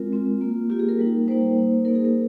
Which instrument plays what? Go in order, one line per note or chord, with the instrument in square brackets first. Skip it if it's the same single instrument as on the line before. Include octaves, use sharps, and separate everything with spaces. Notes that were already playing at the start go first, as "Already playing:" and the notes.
Already playing: [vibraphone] G#3 C4 F4 A#4
G#3 C4 F4
A#3 F4
A#3 F4 G4
G#4
A#4
G3 A#3 D#4
G3 A#3 D#4 C5
A#3 D#4
A#3 D#4 A#4
G#4
A#4